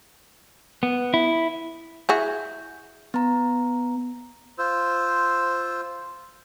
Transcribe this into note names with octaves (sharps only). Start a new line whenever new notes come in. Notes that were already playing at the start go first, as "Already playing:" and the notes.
B3
E4
E4 F#4 G#4 G6
B3 A#5
F4 C5 E6